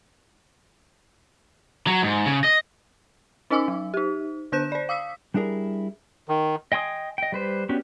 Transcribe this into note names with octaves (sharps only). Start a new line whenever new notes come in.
F#3
G#2
C#3
D#5
C#4 D#4 D#5 G#5 D6 E6
F#3
D#4 G4
D3 D4 C5 F#6 G6 E7
C5 D5
F5 D#6 E6 B6
G3 D4 E4 G#4 A#4
D#3
D#5 G5 G#5 C6 D#6
D#5 G5
G3 B4 C5
B3 C#4 D4 F#4 G4